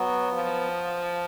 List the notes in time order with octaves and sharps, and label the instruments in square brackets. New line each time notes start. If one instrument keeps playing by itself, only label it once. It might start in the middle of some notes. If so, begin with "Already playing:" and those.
Already playing: [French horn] F#3 [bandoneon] B3
[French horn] F3